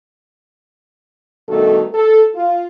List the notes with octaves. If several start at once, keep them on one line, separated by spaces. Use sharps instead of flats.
G2 B2 D#3 A3 F#4 A4
A4
F4